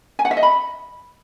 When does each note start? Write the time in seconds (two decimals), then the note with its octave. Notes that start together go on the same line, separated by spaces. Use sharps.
0.19 G#5
0.25 F#5
0.31 E5
0.37 D#5
0.43 B5